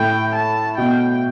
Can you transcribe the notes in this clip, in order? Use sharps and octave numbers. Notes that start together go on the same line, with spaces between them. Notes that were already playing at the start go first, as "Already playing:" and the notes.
Already playing: A2 G5
A5
B2 G5